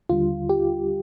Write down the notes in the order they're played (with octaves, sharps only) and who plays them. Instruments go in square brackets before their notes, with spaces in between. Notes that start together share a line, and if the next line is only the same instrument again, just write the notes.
[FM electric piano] D#2 D3 G3 F4
G4